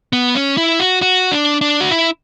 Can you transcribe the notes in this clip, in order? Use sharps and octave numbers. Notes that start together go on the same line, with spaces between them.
B3
C#4
E4
F#4
F#4
D4
D4
F#4
E4